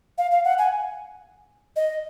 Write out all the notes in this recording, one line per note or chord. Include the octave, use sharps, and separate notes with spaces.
F5
F5
F#5
G#5
D#5